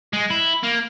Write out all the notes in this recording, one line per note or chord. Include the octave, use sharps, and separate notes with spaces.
G#3
E4
A#3